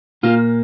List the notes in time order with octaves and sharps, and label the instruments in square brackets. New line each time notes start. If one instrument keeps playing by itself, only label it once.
[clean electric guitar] A#2 A#3 F4